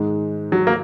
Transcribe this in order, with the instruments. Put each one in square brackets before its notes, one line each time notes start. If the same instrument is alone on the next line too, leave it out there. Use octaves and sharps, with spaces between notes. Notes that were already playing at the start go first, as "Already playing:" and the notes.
Already playing: [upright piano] G#2 D#3 G#3
[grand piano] F#3
A#3